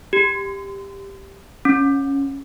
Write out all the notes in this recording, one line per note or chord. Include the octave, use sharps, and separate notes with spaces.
G4
C#4